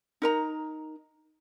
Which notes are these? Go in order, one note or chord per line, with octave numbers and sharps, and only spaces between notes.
D#4 A#4 A#5